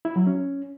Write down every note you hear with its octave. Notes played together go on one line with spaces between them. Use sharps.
E4
F#3
C#4